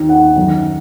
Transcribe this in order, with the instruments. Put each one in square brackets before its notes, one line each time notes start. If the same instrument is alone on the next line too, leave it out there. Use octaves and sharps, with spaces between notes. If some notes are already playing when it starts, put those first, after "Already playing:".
Already playing: [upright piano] D#2 D#3
F#5
F#2 D#3